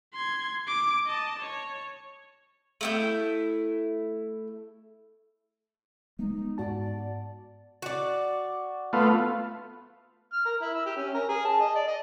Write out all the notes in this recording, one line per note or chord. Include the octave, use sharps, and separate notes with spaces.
C6 G#6
D6
D#5 A5
C#5
A3 E4 G6
G#3 B3 D#4
G#2 F#4 D5 A5
F#4 D5
A3 B3 F4
F6
A#4
E4
E6
G4
C#4
A#4
G#4
A5
D#5
D5
D#5